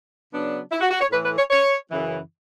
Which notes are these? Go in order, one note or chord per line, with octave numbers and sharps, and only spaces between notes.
C#3 F#3 B3 D4
E4
F#4
F#4
C#5
A2 E3 A3 B4
B4
C#5
C#5
F#2 C#3 E3